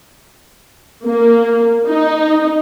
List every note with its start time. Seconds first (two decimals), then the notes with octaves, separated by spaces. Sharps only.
1.05 A#3
1.87 D#4